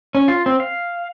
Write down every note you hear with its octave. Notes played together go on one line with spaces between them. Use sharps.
C#4
F4
C4
F5